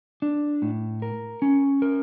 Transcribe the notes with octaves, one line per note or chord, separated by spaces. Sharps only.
D4
A2
A#4
C#4
A#4